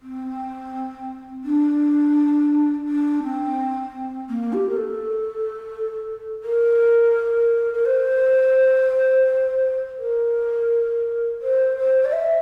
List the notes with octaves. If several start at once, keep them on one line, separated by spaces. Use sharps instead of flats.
C4
D4
D4
C4
A#3
G4
A#4
A4
A#4
A#4
C5
A#4
C5
C5
D5
E5